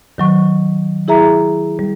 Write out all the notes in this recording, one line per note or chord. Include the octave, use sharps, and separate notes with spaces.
D#3 F#3 C#6
E4 G#4 E5 A#5
G3